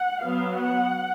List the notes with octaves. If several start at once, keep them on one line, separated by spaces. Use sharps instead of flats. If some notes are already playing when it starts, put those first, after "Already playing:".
Already playing: F#5
F#3 B3 F5
F#5